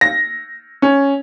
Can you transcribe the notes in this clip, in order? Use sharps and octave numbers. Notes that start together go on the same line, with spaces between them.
A#6
C#4